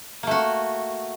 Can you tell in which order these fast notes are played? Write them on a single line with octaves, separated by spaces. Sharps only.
A#3 A3 F#4